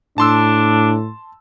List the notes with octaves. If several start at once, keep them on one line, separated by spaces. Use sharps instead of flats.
A2 D4 A5 C6 E6